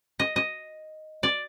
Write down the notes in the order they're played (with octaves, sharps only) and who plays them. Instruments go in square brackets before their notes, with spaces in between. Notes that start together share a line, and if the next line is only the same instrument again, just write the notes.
[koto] D#5
D#5
D5